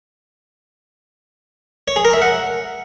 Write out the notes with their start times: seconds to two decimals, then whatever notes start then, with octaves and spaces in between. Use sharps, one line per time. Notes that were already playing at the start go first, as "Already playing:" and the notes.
1.88 C#5
1.96 G#4
2.05 A#4
2.13 E5
2.22 F#5